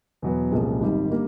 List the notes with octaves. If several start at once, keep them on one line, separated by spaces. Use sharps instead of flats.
E2 B2 F#3 B3
C2 A#2 F3 G#3 C#4
G#1 G#2 D#3 G3
D3 G3 A#3